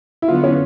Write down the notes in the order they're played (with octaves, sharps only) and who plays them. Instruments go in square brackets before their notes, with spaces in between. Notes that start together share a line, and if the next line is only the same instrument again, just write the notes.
[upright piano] E4
[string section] D3 F#3 B3 [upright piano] F4
[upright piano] C#4